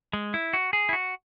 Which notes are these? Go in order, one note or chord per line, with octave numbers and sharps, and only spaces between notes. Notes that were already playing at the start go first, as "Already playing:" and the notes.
G#3
E4
F#4
G#4
E4
F#4